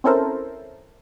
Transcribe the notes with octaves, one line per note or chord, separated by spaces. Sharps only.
C4 C#4 E4 A4 A#4 C5